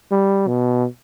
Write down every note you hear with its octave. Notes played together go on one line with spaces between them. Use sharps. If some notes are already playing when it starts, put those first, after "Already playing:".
G3
B2